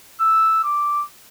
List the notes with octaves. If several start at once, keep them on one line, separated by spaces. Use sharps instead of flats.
E6
D6